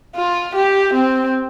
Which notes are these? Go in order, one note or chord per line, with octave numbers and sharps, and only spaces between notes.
F4
G4
C4